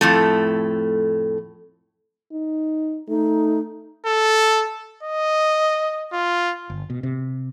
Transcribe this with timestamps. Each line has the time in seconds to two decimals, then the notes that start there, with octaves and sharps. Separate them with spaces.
0.01 F2 A2 A3
2.32 D#4
3.08 A3 D#4
4.06 A4
5.03 D#5
6.13 F4
6.70 G1
6.90 B2
7.03 C3